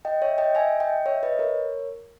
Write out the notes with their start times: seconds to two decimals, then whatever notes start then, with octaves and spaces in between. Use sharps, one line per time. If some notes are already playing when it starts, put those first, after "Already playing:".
0.05 D#5 G5
0.22 C#5 E5
0.38 D#5 G5
0.55 E5 G#5
0.80 D#5 G5
1.06 C#5 E5
1.23 B4 D#5
1.39 A#4 C#5